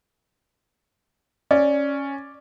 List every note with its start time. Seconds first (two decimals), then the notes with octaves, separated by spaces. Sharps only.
1.51 C#4 D5